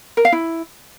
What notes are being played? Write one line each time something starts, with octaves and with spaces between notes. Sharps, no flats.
A#4
F5
E4